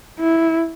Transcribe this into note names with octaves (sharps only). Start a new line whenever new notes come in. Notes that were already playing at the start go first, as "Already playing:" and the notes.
E4